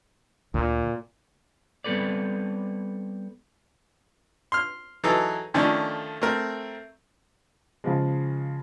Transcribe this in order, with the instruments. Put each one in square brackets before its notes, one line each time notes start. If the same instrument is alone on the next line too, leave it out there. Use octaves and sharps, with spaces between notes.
[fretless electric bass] D2 [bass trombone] A#2
[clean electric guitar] G3 B3 C4 A4 B4 D5
[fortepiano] C6 F6
E3 F#3 D#4 G#4 A4
D3 D#3 F3 A3 C#4 D4
A3 C4 A#4
[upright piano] C#3 F3 G#3